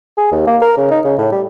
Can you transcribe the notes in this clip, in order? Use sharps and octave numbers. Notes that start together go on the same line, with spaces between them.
G#4
D#2
A#3
A#4
C#3
D#4
C#3
A2
G3